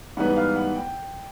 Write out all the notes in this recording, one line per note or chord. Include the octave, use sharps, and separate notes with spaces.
G#2 E3 G3 B3 F#5
F5
F#5
G5